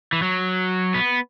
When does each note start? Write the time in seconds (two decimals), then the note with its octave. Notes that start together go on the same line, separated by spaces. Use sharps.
0.13 E3
0.22 F#3
0.94 B3